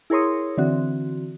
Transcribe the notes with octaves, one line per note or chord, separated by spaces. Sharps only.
E4 G#4 A#4 C#5 C6 D#6
D3 E3 C4 F#4